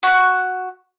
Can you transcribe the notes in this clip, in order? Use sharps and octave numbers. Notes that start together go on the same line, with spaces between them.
F#4 F#6